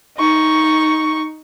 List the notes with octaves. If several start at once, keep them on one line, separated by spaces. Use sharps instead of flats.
D#4 C#6